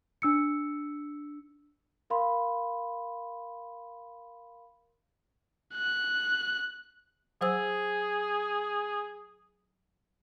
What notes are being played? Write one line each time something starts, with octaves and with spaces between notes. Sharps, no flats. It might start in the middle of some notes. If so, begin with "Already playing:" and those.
D4 E6 C#7
A#4 F5 B5 C6
F#6
F#3 G#4 C5 E6